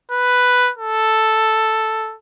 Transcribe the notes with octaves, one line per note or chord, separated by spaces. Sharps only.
B4
A4